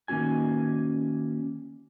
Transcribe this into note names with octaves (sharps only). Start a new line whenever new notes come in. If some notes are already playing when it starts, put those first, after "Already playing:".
D#3 A#3 C#4 F#4 G#5